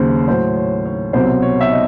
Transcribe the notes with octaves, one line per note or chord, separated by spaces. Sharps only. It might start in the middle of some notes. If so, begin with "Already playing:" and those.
Already playing: D#2 C#3 F#3 C5
A2 F#3 C5
C#5
C#5
C2 B2 F#3 C5
C#5
E5
D#5